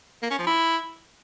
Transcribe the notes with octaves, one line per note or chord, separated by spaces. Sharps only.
A#3
C#4
F3
E4